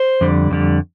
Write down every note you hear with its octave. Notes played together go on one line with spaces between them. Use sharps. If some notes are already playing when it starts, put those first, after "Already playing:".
Already playing: C5
F2 D3 G3
F2 D3 G3